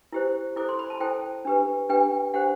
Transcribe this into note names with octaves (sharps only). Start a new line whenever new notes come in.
E4 G4 C5
E4 A4 C5 D6
C6
B5
A5
E4 A4 C5 G5
D4 G4 B4
D4 G4 B4 G5
D4 G4 C5 F#5